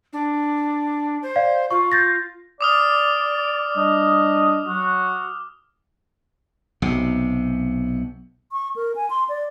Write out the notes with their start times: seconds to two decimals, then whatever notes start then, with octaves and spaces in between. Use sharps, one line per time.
0.13 D4
1.22 C5
1.36 D5 F5
1.71 F4 C#6
1.92 G6 A6 A#6
2.61 D5 D6 D#6 F6
3.75 G3 D4 D#5
4.66 F#3 F#4
6.82 B1 C3
8.52 C#6
8.76 A#4
8.96 G#5
9.10 C6
9.29 D5